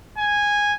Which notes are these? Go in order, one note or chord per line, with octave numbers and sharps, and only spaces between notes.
G#5